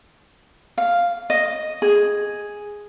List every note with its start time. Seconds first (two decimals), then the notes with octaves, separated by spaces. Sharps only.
0.78 F5
1.30 D#5
1.82 G#4